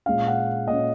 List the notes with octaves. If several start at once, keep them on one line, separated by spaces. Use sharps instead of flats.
A#2 G#3 C#4 F5
F#5
A#2 G#3 C#4 D#5